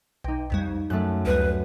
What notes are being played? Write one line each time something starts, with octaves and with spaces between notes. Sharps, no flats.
B1 D#4 G5
C2 F2 G3
F#2 A3 F#6
D2 G3 B4